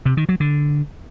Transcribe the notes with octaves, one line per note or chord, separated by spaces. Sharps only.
C3
D#3
F#3
D3